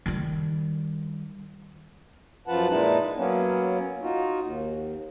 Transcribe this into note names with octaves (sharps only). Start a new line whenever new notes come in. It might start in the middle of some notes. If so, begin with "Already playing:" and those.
D#3 G3
F#2 F3 F4 B4 F#5 A5
A#2 G#3 D#4 E4 B4 A5
F#3 A#3 B3 C#4
D#4 F4 F#4
D#2